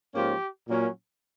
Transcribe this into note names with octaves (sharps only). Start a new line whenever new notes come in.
G#2 F3 A#3 C#4 G4
A#2 F#3 A#3 C#4